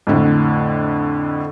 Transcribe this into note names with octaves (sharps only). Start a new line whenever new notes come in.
F2 A2 D3